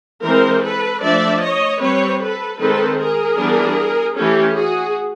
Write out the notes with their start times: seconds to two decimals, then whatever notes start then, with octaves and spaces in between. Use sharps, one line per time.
0.23 E3 G#3 C4 A#4 C5
0.62 A4 B4
1.02 F3 A3 D4 D5 E5
1.41 C#5 D#5
1.80 G3 C4 B4 C#5
2.20 A4 B4
2.59 D#3 G#3 C4 A4 B4
2.99 G#4 A#4
3.38 E3 G3 B3 D4
4.16 E3 A3 C#4 G4 A4
4.55 F#4 G#4